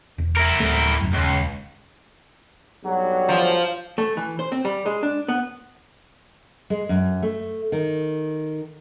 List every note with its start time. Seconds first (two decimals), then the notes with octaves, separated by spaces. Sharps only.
0.18 E1
0.36 E4 A#4
0.60 D1 A3
1.01 F1 F#2
1.14 D#1 C#2
2.83 B1 G2 F#3
3.29 F3
3.98 A3
4.17 E3
4.39 C5
4.52 C4
4.65 G3
4.86 G#3
5.03 D4
5.28 B3
6.70 G#3
6.89 F#2
7.22 A3
7.72 D#3